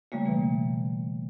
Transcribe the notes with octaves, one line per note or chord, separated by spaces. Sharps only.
C#3 G3 A3 A#3
B2 E3 A#3